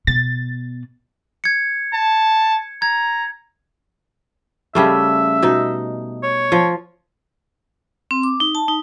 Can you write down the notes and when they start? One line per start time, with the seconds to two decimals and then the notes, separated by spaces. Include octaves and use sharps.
0.07 B2 A6
1.44 G#6 C#7
1.94 A5
2.82 A#5 G#6
4.75 C#3 G3 A3 E5
5.42 B2 D#4
6.23 C#5
6.52 F3
8.11 C4
8.23 D6
8.40 D#4
8.55 A5
8.68 D#4